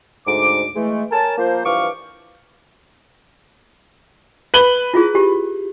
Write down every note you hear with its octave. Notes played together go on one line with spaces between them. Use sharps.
D2 G#2 D6
E3 G#3 A3
A#4 C#5 G#5 A5
F3 A#3 C5
G2 E3 F3 F5 C#6 D6
B4 F#7 G7
E4 F4 G#4
G4